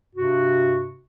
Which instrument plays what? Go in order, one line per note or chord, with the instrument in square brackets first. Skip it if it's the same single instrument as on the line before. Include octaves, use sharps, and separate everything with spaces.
[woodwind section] G2 C3 F#4